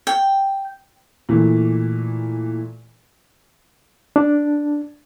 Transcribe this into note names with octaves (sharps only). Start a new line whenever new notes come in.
G5
A#2 E3 A3
D4